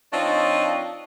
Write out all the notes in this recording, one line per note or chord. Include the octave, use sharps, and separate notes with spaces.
F3 C4 D4 D#4 C#5 D#5